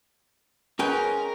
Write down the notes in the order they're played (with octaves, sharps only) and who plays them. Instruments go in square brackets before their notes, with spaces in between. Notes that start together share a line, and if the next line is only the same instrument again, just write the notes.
[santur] G#3 C#5 F#5 [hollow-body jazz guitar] C#4 B4 G5 [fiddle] A#4